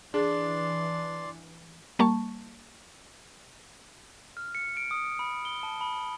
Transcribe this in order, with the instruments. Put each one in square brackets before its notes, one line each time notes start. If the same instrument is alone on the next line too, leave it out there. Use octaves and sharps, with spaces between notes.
[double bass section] E3 [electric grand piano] D4 [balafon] G#4 [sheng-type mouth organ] D5 C6
[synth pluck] G3 A#3 A5 C#6
[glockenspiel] F6
C#7
D7
D#6
B5
G7
A5
B5